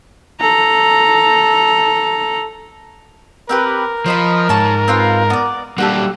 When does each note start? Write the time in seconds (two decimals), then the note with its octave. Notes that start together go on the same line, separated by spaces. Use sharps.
0.41 A4 A#5
3.49 C4 G4 A#4 B4
4.06 F3 C5 D#5 B5
4.49 G#2 C#5 A5
4.88 C4 F4 B4
5.30 B3 D5
5.78 G3 A#3 D4 F#4 G4 A4